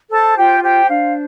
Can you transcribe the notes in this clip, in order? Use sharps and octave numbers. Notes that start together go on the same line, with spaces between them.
A4 C5 A5
F4 G4 G5
G4 C5 G5
D4 F5